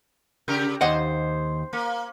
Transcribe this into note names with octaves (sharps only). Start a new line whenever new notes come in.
C#3 G4 A#4
D#2 C5 D#5 F#5
A#3